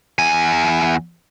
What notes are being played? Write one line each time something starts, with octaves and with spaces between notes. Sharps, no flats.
E2 G#5